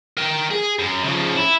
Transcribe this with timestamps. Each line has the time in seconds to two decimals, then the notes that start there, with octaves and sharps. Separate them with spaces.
0.17 A#4 G5
0.50 G#4
0.79 F#2
1.04 C#3 F3
1.37 E4